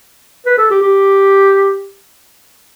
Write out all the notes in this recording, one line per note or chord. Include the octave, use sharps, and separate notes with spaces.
B4
A4
G4
G4